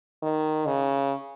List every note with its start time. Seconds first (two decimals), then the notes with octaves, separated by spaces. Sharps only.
0.23 D#3
0.67 C#3